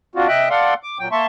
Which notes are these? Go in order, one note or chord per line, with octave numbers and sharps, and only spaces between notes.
C4 D4 F4 F#4
C3 D#5 E5 G5 F#6
A4 D5 F5 F#5 C6
D6
A#2 F#3 G5
A#3 E5 A5 C6 C#6